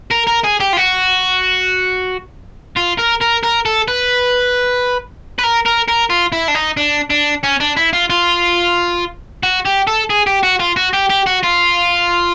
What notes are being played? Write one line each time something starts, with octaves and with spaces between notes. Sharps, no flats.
A#4
A#4
G#4
G4
F4
F#4
F4
A#4
A#4
A#4
A4
B4
B4
A#4
A#4
A#4
F4
E4
D4
D#4
D4
D4
C#4
D4
E4
F4
F4
F#4
G4
A4
G#4
G4
F#4
F4
F#4
G4
G4
F#4
F4